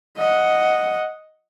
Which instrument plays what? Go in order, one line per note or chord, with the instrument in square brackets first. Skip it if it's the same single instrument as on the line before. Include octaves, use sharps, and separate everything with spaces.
[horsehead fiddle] D#5 F#5